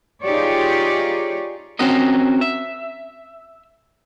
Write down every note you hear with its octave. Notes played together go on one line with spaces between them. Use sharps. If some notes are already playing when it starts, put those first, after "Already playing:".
D#4 F4 G4 G#4 C#5 D5
C4 C#4 F#4 A#4 D#5
E5